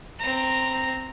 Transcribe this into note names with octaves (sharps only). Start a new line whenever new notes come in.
C4 A#5